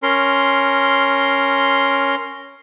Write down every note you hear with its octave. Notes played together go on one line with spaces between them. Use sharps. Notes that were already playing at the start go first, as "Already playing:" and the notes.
C#4 A#4 C6